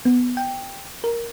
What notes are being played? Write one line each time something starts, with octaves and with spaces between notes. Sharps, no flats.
B3
G5
A#4